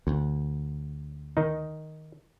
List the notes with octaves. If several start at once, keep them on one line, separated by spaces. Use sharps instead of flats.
D2
D#3 D#4